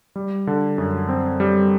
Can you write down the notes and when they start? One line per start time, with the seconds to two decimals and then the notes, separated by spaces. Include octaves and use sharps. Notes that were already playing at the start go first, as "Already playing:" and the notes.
0.16 G3
0.47 D3
0.78 F#2
1.09 C4
1.40 G3